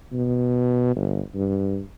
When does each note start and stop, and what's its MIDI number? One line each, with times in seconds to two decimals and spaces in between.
0.13 0.96 47
0.96 1.20 31
1.35 1.81 43